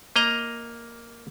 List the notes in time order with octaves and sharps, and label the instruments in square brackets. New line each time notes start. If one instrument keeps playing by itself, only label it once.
[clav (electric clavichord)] A#3 D#5 A#5